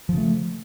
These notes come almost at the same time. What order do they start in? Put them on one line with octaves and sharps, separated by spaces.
F3 C#3 A3